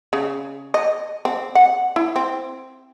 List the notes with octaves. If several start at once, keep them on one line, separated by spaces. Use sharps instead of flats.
C#3
D#5
C4
F#5
E4
C4